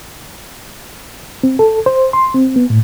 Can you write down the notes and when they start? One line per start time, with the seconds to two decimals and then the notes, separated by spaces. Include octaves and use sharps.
1.43 C4
1.59 A4
1.86 C5
2.13 C6
2.34 C4
2.56 B3
2.70 A2